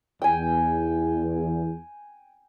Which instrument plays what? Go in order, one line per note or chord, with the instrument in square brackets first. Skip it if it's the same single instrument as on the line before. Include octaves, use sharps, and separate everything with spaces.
[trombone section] E2 [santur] G5 G#5